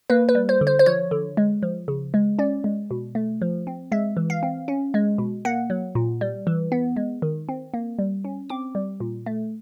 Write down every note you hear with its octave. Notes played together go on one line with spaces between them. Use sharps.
A#3 B4
B4
G3
C5
D3
C5
C5
F3 C#5
D3
G#3
F3
C#3
G#3
C#4 D5
G#3
B2
A3
F3
C4
G#3 E5
E3
F5
C4
C#4
G#3
B2
A#3 F#5
F#3
A#2
G3
E3
B3
G#3
D#3
C4
A#3
G3
C#4
C4 D6
G3
A#2
A3